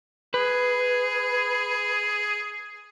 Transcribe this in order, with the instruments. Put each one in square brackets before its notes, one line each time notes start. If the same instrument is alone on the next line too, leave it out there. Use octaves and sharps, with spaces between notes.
[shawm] G#4 [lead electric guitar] B4